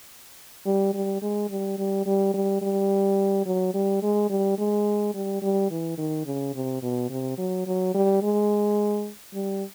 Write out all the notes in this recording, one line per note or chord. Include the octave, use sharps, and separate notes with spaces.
G3
G3
G#3
G3
G3
G3
G3
G3
F#3
G3
G#3
G3
G#3
G3
G3
E3
D#3
C#3
C3
B2
C3
F#3
F#3
G3
G#3
G3